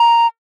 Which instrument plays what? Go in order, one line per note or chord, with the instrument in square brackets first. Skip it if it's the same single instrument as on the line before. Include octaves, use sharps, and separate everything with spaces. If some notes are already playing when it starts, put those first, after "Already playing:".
Already playing: [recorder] A#5